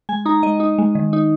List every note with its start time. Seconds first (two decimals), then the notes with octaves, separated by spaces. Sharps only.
0.09 G#3 G#5
0.25 D#4 A#5
0.43 G#3 D#5
0.60 D#4
0.78 G#3
0.95 D#3
1.13 D#4